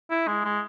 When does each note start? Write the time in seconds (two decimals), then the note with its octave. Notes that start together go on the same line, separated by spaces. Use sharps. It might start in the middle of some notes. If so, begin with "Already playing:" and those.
0.10 E4
0.28 G#3
0.45 G#3